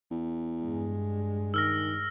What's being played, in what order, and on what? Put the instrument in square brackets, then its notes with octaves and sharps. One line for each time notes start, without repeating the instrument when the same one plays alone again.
[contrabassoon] E2
[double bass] G2 G#3
[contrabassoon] D#3 [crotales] E6 F6 A#6